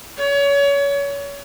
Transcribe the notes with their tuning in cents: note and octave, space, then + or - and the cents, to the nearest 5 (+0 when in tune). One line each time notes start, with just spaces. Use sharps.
C#5 +30